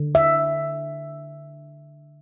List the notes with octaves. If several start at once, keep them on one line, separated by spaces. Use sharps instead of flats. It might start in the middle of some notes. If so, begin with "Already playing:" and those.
Already playing: D3
E5